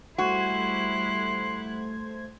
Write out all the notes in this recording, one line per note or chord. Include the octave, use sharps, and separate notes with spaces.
G3 A3 E4 F#4 C5 C6 F#6 G#6